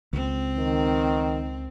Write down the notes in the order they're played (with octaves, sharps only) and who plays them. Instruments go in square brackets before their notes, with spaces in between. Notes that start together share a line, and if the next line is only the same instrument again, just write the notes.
[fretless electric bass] C#2 [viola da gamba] C4
[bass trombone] D#3